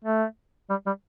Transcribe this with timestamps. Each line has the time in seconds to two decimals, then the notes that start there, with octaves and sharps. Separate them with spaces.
0.05 A3
0.70 G3
0.87 G3